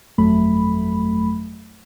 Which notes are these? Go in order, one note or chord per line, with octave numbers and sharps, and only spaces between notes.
G1 F2 F#3 A3 B5